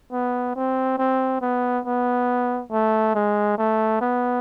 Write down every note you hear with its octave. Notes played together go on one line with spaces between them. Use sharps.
B3
C4
C4
B3
B3
A3
G#3
A3
B3